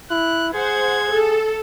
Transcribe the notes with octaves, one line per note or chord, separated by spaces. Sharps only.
E4 F#6
G#4 C5 F#5 G#6
A4